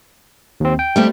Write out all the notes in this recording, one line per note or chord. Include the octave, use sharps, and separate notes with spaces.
D#2 C4
G5
G3 A3 C4